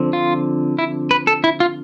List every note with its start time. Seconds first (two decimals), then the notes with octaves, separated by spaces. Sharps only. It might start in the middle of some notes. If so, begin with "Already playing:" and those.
Already playing: D3 F3 C4
0.13 F4
0.79 E4
1.11 B4
1.27 A4
1.44 E4
1.60 F4